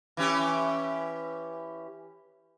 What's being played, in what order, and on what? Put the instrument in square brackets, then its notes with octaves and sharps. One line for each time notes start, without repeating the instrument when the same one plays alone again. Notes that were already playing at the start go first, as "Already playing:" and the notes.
[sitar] E3 C#4 G4